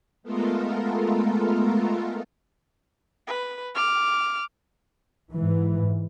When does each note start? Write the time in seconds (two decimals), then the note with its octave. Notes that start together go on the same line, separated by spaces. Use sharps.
0.23 G#3 A3 B3 F4 A4 A#4
3.28 B4
3.75 D6 F6
5.33 G#2 E3